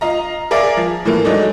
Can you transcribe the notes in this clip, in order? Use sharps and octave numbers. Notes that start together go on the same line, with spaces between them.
F4 D#5 A#5
G#4 A#4 D5 E5 F5
F3
A2 E3 F3 A#3
F#3 G#3 A3 D4 D#4